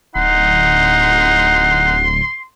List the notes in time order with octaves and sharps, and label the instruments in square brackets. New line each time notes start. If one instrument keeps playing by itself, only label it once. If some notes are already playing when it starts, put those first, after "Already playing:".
[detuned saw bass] D1 [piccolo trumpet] D#4 [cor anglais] F#5 [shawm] C6